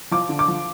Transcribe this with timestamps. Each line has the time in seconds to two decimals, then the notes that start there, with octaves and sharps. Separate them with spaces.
0.11 F3 D6
0.29 D3
0.39 D6
0.48 F3